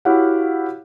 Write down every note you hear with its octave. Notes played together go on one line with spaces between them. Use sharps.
E4 F#4 G4 C#5 F5 F#5